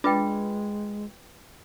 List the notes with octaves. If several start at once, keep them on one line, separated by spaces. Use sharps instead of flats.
G#3 D4 F4 B4 G5